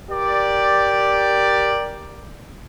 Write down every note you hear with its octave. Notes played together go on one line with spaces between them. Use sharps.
G4 A#4 D5